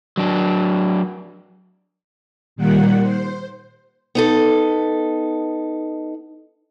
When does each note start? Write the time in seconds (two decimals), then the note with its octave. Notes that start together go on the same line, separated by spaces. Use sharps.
0.17 F#3 D4
2.56 A#2 D#3 G3 A#3 F#5
3.03 C5
4.15 B3 D#4 A4